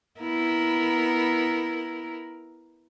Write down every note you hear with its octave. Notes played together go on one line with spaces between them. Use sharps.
B3 E4 A#4